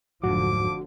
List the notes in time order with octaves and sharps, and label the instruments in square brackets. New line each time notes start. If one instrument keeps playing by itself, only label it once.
[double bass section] F1 D3 F3 [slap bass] D2 G#2 F#3 [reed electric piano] F#4 [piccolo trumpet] D6